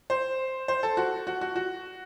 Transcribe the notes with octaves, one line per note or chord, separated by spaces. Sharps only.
C5
C5
A4
F#4
F#4
F#4
F#4